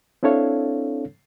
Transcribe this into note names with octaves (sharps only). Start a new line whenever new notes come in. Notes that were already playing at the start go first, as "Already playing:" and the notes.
C4 D4 E4 A4 C#5 F5